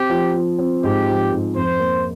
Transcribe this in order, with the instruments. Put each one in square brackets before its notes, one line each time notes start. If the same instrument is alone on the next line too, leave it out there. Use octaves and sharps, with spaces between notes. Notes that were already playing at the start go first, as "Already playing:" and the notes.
Already playing: [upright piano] C4 [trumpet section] G4
[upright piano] F3
F3
C4
[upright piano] G#2 [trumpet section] G4
[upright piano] F3
G#2
[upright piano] F2 [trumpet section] C5
[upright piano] A#3